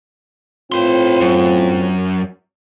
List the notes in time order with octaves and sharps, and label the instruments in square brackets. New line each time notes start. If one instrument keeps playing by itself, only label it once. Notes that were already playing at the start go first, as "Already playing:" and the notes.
[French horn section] A2 C4 F4 [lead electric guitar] B4 C6
[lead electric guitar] F#2